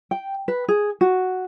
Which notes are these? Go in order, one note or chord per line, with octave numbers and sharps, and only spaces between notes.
G5
B4
G#4
F#4